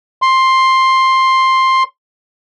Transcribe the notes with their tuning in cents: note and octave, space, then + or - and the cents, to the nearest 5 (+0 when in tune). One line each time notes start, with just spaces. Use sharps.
C6 +10